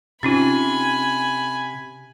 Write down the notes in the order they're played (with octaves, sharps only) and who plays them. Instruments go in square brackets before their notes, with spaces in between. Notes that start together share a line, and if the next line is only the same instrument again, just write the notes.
[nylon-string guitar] C3 [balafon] C#4 D#4 F4 [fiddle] G#5 B5